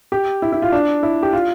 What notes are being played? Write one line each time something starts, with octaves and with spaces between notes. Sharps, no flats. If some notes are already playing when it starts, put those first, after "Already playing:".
G4
E4
E4
F4
D4
E4
G4
F4